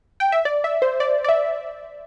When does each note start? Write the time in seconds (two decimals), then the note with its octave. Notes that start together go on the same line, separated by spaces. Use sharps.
0.20 G5
0.32 E5
0.45 D5
0.64 E5
0.82 C5
1.00 D5
1.24 D5
1.29 E5